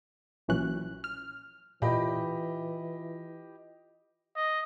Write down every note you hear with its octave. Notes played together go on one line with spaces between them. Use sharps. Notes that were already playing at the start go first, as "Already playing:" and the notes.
A#1 A#2 E3 F#3 C#4 F#6
F6
A#2 E3 F4 G4 D#5 B5
D#5